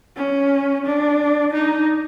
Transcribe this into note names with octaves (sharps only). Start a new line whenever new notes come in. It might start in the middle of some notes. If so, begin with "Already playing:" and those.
C#4
D4
D#4